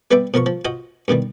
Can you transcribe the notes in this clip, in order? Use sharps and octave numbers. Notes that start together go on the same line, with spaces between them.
G3 B3 B4 D5 E5 G5
B2 F3 A#4 C#6
F3
F4 F#4 C5 D#5
G2 B2 D#3 G3